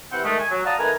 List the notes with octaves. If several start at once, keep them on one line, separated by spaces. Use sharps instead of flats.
C3 E3 C4 E4 F#5 G5
D#3 G#3 A3
G#5
F#3
D5 F5 F#5 A5 A#5 D#6
D#3 A3 A#4 B4 G#5 A#5